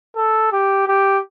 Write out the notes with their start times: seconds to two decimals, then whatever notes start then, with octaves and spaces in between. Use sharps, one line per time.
0.16 A4
0.52 G4
0.88 G4